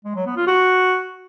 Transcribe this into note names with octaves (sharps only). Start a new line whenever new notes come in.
G#3
F#3
B3
F4
F#4